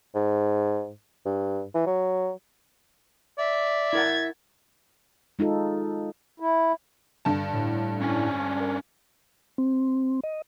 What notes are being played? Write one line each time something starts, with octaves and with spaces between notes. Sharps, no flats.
G#2
G2
E3
F#3
D5 E5
E4 A#4 F#5 G#6 A6
G#3 D#4 F4 A4
E4
G2 D3 A5
A2
C#4 D4 G#5
A#4
C4
D#5